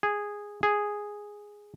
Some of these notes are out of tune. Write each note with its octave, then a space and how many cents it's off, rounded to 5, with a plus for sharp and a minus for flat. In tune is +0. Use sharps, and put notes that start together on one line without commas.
G#4 -10
G#4 -5